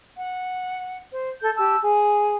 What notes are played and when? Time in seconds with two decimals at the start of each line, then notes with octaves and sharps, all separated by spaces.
0.17 F#5
1.12 C5
1.41 A4 G6
1.56 G4 A5 E6
1.82 G#4